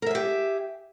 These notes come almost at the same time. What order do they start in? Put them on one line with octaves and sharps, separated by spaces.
A#4 E5 G#4 G4